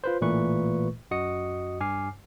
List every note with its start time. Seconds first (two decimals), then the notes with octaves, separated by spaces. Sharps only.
0.04 F4 B4 C5
0.21 A1 A#2 E3 A3 B4 C#6
1.11 F#2 F#4 D#5 D#6 C#7
1.80 G2 G#5 D6 F6 C7